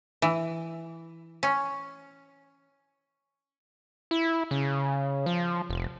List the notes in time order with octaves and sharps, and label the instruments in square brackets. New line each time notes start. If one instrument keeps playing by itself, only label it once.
[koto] E3
C#4
[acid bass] E4
C#3
F3
F1